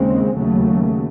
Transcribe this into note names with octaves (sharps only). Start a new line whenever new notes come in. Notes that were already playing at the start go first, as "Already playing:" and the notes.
Already playing: D#2 C#3 G#3 C4
D#2 C#3 F#3 A3